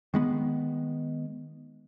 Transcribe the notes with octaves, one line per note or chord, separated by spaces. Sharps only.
D#3 G#3 B3